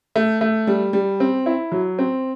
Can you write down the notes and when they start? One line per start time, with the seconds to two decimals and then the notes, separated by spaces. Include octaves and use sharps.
0.16 A3
0.41 A3
0.67 G3
0.93 G3
1.20 C4
1.46 E4
1.72 F#3
1.99 C4